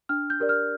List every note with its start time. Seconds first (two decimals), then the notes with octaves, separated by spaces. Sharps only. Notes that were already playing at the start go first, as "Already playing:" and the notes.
0.09 D4 F6
0.30 G6
0.40 G4 A#4 D5
0.49 F6